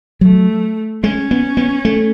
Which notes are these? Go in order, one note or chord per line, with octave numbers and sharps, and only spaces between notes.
F#3 A3
G#3 C#4
B3
B3
A3